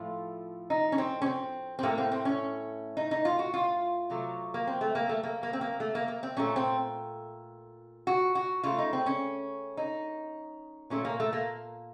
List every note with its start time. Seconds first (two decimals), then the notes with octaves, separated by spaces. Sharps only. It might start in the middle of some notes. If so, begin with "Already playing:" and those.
Already playing: A2 F3 A3 F4
0.70 D#4
0.92 C#4
0.98 C4
1.22 C#4
1.26 C4
1.79 C4
1.83 A2 A3 A#3
1.98 C4
2.12 C4
2.25 C#4
2.97 D#4
3.11 D#4
3.25 F4
3.39 F#4
3.54 F4
4.10 C3 F#3 A3
4.54 A#3
4.67 C4
4.81 A3
4.95 A#3
5.09 A3
5.23 A#3
5.43 A#3
5.53 C4
5.61 A#3
5.80 A3
5.95 A#3
6.08 A#3
6.23 C4
6.37 A#2 A3 C#4
6.56 C4
8.07 F#4
8.35 F#4
8.63 C#3 A3 F4
8.78 D#4
8.93 C4
9.06 C#4
9.77 D#4
10.90 A#2 A3 C#4
11.05 A#3
11.20 A3
11.33 A#3